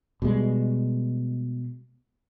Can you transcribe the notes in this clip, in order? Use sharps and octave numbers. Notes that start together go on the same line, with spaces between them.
B2 G3 G#3